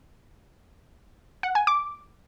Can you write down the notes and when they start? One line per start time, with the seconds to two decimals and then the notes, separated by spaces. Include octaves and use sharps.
1.43 F#5
1.55 G#5
1.67 D6